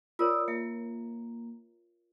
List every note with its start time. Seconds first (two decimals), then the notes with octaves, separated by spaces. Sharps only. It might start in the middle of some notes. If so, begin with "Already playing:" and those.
0.19 F4 A#4 C#5 D5 D#6 E6
0.48 A#3 E5